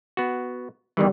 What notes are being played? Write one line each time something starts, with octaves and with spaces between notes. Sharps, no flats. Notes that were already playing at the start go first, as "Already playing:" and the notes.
B3 F#4
E2 D#3 E3 G3